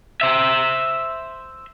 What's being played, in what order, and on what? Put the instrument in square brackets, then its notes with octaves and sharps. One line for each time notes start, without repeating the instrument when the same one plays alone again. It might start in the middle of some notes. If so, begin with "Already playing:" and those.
[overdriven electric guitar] C5 E5